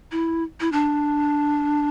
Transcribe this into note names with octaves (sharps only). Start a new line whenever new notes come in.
E4
E4
D4